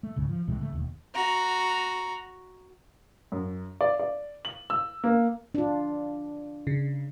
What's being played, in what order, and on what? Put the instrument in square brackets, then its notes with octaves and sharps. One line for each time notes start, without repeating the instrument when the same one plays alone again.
[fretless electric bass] A3
C#2 G#2 C#3
F3
C2 A2 E3 G#3
C#3 G#3 A3
E1 D#2
[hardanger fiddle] F#4 A#5
[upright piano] F#2
D5
D5
F#7
E6
A#3
[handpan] D4 F4
[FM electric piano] C#3